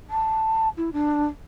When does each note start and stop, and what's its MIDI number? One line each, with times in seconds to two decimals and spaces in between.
0.10 0.69 81
0.77 0.90 64
0.93 1.26 62